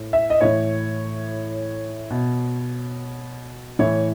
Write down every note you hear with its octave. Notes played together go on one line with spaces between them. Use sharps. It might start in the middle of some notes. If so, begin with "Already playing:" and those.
Already playing: A2
E5
D#5
A2 E3 C#5
B2
A2 E3 C#5